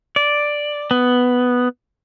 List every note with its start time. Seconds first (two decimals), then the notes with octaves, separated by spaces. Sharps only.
0.16 D5
0.91 B3